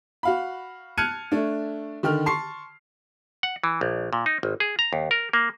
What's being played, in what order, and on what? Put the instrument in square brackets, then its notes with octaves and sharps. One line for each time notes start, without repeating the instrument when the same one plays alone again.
[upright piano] F#4 F5 B5
A5 F6 F#6 G#6 C#7 D#7
A3 D4
D3 D#3 G5 F6
A5 C6 C#6 C7
[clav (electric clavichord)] F#5
E3
A#1
A#2
D#4
G#1
G#4
A#5
D#2
A#4
A#3